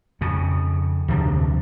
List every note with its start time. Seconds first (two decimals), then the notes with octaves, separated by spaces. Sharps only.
0.21 F2 C#3
1.08 D2 C3 F3 D4